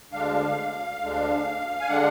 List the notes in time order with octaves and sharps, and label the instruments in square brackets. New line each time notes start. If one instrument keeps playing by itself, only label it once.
[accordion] D2 D3 G#3 D4 F5
D2 D3 G#3 D4
G#5
D3 G#3 D4 F#5